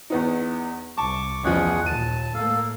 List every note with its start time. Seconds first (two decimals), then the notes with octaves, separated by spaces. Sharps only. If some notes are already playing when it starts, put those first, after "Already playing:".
0.10 E2 B3 D#4
0.98 C2 A5 C#6 D6
1.44 A1 E2 F3 G#4 F#5
1.86 D#2 A#2 A5 D#7
2.34 A2 A#3 A4 F5